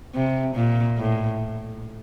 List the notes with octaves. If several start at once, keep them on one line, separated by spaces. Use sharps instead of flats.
C3
A#2
A2